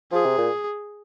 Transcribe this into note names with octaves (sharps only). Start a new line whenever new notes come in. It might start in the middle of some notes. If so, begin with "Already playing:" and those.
F3 G#4
C3
A#2